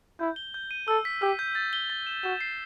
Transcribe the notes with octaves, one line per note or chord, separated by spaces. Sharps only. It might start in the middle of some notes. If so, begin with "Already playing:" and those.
E4 G6
G7
G6
D#7
A4 E6
B6
G4 E6
G6
A6
G7
A6
E7
F#4 E7
C7